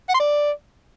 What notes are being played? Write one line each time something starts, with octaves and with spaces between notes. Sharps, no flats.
F#5
C6
D5